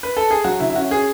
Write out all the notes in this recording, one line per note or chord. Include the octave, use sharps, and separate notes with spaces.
B4
A4
G#4
F#3 F#4
D3 E4
E4
C#4 F#4
G#4